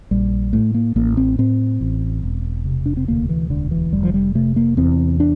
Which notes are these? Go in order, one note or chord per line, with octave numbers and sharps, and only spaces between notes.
A#1 G3
A2 A3
A#3
A1 A#3
C4
A2 C4
A1
E1
C3
D4
C4
D2 A#3
E3
E1 D3
E3
F1 G3
F3
G3
C3 A3
A#3
E2 C4
D4